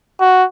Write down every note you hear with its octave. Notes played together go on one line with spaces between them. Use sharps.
F#4